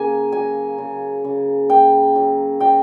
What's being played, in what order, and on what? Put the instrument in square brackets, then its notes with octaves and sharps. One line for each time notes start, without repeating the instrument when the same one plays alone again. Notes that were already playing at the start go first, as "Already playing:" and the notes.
Already playing: [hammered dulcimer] C#3 A#3 G#5
F#3 G#5
C#3
C#3
A#3 G5
F#3
F#3 G5